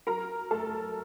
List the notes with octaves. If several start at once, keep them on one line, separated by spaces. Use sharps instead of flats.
F#3 A#4 A#5
A3 A4 A5